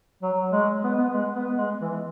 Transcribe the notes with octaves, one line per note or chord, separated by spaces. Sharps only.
F#3
G#3
B3
B3
G#3
B3
G#3
E3